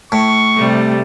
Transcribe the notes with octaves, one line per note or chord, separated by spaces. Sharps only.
A2 C#6
C3 G3 A3